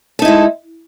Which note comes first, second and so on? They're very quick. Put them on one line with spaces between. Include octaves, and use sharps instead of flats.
A4 D#4 E4 G#3